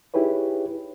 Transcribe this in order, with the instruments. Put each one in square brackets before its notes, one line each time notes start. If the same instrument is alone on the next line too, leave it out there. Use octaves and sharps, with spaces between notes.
[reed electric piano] D#4 E4 G4 G#4 B4 C#5